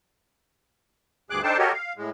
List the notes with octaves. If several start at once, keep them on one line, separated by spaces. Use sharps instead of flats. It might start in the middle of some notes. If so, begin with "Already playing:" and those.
D2 G2 G#4 D6 F#6
D4 D#4 A4 C5 G5 A5
F#4 G4 A4 A#4 C#5 D#5
F5
A2 G#3